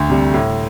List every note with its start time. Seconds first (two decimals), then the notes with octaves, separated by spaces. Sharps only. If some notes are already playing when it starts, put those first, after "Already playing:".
Already playing: D2
0.09 C3 G3
0.34 A2